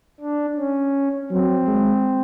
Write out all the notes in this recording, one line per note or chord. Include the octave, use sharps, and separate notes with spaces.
D4
C#4
F#3 C4
G#3